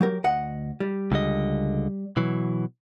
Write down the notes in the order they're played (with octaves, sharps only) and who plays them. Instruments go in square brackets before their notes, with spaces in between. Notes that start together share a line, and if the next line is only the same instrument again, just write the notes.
[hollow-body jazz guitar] F#3 G4 A#4
D2 D#5 F#5
G3
[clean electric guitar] C#2 D3 D#5
B2 E3 F#3